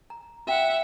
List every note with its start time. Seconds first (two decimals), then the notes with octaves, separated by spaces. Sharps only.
0.10 A#5
0.47 F#4 E5 F#5 G5 B5